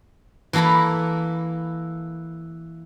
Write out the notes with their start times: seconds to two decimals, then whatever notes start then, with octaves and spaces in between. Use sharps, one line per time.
0.53 E3 A#3 A4 A#5 B5